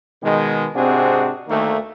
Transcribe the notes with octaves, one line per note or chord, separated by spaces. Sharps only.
B2 D#3 G#3
G#2 C3 C4 D4 F#4 G#4
D2 D#3 A3 A#3